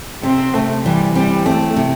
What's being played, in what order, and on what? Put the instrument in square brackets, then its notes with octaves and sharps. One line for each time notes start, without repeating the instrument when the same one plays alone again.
[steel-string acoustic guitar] C3 [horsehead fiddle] C4
[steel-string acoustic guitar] C3 [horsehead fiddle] A3
[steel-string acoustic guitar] E3 [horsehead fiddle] G3
[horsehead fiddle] G3 [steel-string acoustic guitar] C4
[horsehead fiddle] A3 [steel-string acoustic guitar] C4
[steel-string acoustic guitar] C3